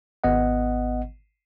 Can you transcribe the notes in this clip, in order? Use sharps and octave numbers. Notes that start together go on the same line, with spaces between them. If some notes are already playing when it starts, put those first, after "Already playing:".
G#1 B3 D#5 F#5